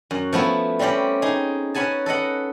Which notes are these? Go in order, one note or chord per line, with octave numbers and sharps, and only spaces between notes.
F#2
F3 A3 B3 E4
G3 C4 C#4 G4 D5
D#4 G#4
C#4 B4 F#5 G#5 A5
A4 B4 D#5 F#5